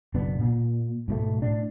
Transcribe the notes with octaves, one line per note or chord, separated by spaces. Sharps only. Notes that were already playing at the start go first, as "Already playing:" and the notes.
F#1 B2 B3 D4
A#2
G#2 B2 A3
A2 D4